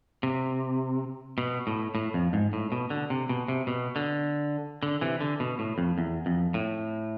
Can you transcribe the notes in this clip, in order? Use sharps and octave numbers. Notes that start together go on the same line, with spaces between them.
C3
B2
A2
A2
F2
G#2
A2
B2
D3
C3
B2
C3
B2
D3
D3
C3 E3
D3
B2
A2
F2
E2
F2
A2